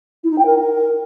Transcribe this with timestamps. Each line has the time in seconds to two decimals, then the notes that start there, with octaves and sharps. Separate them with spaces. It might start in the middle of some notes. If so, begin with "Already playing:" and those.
0.24 E4
0.31 D#4
0.38 G5
0.46 A#4